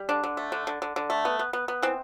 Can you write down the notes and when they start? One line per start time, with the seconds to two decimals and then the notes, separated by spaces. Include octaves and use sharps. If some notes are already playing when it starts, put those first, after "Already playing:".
Already playing: G3
0.09 D3 D4
0.24 D3
0.37 A3
0.52 D3
0.67 D3
0.82 D3
0.96 D3
1.10 A3
1.25 B3
1.39 B3
1.53 B3
1.68 B3
1.82 E3 C4